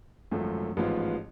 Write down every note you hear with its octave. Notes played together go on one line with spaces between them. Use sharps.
G#1 F#2 F3 A3
A1 G#2 F3 B3 F4